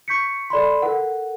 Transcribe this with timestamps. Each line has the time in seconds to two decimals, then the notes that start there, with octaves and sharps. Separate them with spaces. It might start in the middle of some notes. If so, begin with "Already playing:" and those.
0.08 C#6 G6 B6 C#7
0.50 A4 D5 B5 C6
0.82 A4 A#4 F#5